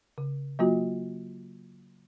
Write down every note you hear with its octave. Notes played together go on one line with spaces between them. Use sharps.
C#3
F#3 A#3 F4 F#4